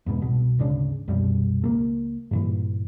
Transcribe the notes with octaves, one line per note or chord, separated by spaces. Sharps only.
E2 G#2 B2
C2 B2
G#1 D2 C#3 D4
C2 F#2 B2 G3
C#2 A3 A#3
G2 A#2 E3